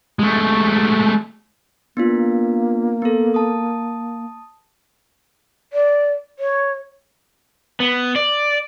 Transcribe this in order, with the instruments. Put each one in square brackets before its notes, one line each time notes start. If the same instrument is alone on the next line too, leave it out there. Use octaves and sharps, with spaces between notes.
[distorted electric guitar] G#3 A3
[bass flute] A#3 [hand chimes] B3 D4 F4
[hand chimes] B3 A4
A5 D#6
[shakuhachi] D5
C#5
[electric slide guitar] B3
D5